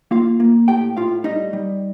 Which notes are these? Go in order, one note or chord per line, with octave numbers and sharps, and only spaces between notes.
A#3 F4 F5
A#3
A2 G4 G5
A2 F4 F5
G3 D#4 D#5
G3